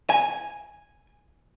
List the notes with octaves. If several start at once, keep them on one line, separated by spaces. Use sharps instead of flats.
G#5